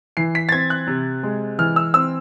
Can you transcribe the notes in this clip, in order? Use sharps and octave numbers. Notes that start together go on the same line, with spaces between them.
E3 C7
B6
A6
C4 G#6
F#6
C3
G#3
E3 F6
E6
C4 E6